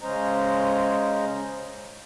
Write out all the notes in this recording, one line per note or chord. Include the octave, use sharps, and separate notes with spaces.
C#3 G#3 C#4 C5 D#5 A#5